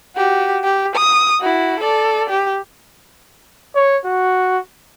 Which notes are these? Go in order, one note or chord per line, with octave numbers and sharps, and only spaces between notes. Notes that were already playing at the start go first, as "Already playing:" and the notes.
F#4 G4
G4
D#6
E4 F#4
A4 D5
G4
C#5
F#4